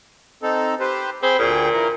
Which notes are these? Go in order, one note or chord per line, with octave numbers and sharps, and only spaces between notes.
C4 D#4 A4
G4 B4 C5
C4 G#4 G5 B5
D2 A#2 G#4 G5
E3 A#4